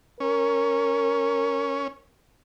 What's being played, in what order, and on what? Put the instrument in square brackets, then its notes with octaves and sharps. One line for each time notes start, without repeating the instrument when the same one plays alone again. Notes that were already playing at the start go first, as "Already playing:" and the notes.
[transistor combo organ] C#4 [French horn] A#4